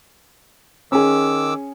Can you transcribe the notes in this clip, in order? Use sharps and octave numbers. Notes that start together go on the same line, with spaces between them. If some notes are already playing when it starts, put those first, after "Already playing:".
D#3 C#4 G#4 D6 E6